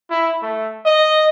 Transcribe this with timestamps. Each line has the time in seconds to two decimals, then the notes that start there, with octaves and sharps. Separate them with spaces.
0.10 E4
0.43 A3
0.85 D#5